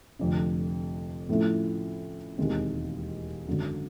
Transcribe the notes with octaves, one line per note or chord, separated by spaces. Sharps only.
F1 F2 D3
A2 F3 A3 C#4 E4
E1 D#2 D#3 G#3 C4
G#1 F#2 D3 F#3